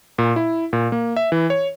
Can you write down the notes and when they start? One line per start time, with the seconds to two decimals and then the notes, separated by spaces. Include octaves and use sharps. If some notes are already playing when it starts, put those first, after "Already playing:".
0.18 A#2
0.36 E4
0.73 A#2
0.92 A#3
1.16 E5
1.32 E3
1.50 C#5